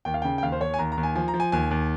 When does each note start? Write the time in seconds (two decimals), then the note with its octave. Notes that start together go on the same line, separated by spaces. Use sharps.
0.05 D#2 G5
0.14 F5
0.22 C#3 G5
0.38 G5
0.43 D#2 F5
0.52 C5
0.61 D#2 C#5
0.74 G#5
0.79 D#2 A#5
0.92 A#5
0.97 D#2
1.03 G#5
1.15 F3 G#5
1.28 A#5
1.34 F3
1.40 G#5
1.52 D#2 G#5
1.71 D#2